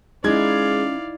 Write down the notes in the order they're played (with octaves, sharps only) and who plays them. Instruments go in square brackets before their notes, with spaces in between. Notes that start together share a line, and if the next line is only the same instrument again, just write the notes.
[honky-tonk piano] G#3 G#6 [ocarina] C#4 [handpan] D#4 E4 [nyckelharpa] D5 F5